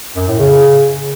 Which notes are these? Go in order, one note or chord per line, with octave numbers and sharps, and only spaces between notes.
F#2
A2
C#3